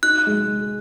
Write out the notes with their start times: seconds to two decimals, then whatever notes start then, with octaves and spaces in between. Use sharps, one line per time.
0.03 D#4 F#6
0.27 G#3